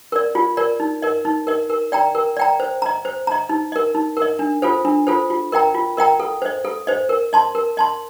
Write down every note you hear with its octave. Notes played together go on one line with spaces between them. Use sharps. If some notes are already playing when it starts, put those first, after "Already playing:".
A#4 D5
F4
A#4 D5
D#4
A#4 D#5
D#4
A#4 D#5
A#4
D5 G5 A#5
A#4
D5 G5 A#5
C5
D#5 A#5
C5
D#5 A#5
D#4
A#4 D#5
D#4
A#4
D#5
D4
F4 A4 C5
D4
F4 A4 C5
F4
A#4 D#5 G5 A#5
F4
A#4 D#5 G5 A#5
A4
C5 D#5
A4
C5 D#5
A#4
D#5 A5 C6
A#4
D#5 A5 C6